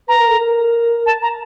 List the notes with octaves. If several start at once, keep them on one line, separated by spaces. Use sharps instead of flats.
B4 A#5
A#4
A4
A#4
A5
A#5